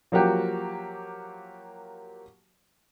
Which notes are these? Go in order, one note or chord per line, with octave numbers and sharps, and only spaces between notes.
F3 F#3 A#3 F#4 G4